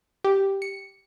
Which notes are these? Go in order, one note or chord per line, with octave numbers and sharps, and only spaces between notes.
G4
C#7